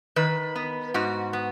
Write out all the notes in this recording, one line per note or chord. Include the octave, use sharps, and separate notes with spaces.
D#3 B4
B3
G#2 F#4
B3